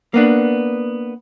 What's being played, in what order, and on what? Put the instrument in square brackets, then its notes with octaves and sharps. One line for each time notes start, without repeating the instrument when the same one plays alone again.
[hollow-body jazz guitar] A#3 B3 D4